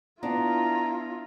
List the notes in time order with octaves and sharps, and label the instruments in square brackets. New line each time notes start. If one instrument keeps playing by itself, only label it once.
[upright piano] B3 [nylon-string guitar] D4 [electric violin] E4 F4 [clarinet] A#5